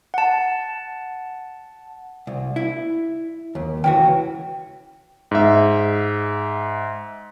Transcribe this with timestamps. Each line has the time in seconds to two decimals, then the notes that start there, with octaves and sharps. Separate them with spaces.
0.14 F#5 A5
2.27 C2
2.56 E4
3.55 D#2
3.84 C#2 E3 F#4 G5
5.31 G#2 E5